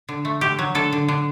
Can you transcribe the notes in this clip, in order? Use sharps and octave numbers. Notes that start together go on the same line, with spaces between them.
D3
A3
D3 G4
F#3
D3 A4
D3
D3